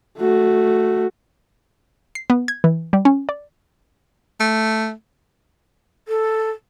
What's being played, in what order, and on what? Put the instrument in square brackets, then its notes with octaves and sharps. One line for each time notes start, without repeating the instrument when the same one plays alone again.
[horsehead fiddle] A3 F#4
[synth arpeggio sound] C7
B3
G#6
E3
G3
C#4
D5
[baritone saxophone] A3
[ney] A4